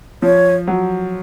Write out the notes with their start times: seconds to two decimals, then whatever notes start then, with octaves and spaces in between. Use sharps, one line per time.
0.22 F3 C#5
0.68 F#3